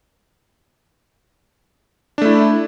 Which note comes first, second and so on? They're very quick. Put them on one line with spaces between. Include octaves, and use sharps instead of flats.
D4 A3 E4